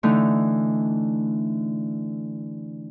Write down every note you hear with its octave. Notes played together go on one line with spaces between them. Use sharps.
D3 E3 A3 D#4